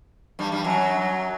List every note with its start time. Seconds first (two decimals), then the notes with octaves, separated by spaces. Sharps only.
0.39 G2 G3
0.52 G2 G3
0.64 F#2 F#3